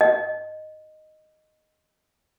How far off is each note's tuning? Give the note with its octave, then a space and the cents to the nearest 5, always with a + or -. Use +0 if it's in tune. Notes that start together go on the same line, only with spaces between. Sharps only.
D#5 -5